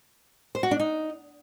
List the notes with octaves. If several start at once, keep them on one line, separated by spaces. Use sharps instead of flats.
C5
F#4
D4
D#4